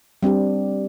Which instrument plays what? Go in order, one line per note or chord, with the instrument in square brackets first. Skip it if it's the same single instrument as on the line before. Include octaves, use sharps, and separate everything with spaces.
[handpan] G3 C4 D4 G4